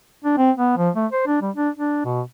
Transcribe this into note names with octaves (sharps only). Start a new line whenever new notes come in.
D4
C4
B3
F3
A3
C5
D4
G3
D4
D4
B2